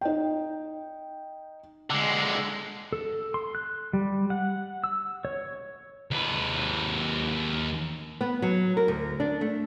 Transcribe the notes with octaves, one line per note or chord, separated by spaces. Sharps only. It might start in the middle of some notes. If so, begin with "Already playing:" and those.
D#4 G5
D3 G#3
A4
C6
F#6
G3
F#5
E6
C#5
D#2 B4
B3
F#3
A#4
D2
D4
A3